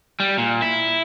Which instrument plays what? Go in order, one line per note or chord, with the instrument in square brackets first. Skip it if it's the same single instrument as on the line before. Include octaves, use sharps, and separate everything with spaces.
[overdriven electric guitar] G3
A#2
E4